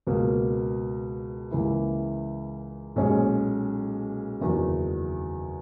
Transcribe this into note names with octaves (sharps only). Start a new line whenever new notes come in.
C#2 B2 A#3
C#2 C#3 E3 A#3 E4
B1 A#2 G#3 C#4 G#4
F#1 E2 D#3 F#3